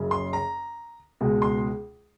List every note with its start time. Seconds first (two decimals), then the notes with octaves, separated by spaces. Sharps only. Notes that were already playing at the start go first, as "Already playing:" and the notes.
Already playing: F#1 F#2 C#3
0.11 C6
0.33 A#5
1.21 C#2 B2 G#3
1.42 C6